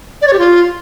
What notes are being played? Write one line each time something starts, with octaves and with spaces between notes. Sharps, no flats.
D5
C#5
G4
F4